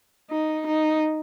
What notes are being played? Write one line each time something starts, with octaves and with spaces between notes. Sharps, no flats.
D#4
D#4